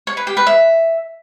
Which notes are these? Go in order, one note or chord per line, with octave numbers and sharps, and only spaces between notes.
C#5
B4
G4
B4
E5